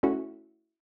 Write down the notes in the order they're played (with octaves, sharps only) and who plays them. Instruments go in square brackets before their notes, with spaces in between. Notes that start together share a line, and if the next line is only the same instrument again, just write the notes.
[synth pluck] A3 C#4 E4 F#4